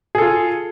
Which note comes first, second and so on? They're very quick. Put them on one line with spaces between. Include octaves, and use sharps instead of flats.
G#4 A4 F4